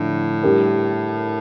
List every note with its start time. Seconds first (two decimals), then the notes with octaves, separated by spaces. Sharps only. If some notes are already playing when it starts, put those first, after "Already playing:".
Already playing: A2 D3 F3
0.43 G3 D4 G4 A#4